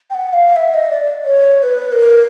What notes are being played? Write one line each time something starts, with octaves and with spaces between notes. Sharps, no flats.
G5
F#5
F5
E5
D#5
D5
C#5
C#5
B4
A#4